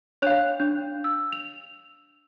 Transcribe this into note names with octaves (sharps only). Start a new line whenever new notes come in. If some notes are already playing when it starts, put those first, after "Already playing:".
D4 C#5 F5 F#6 F7
D4
E6
F7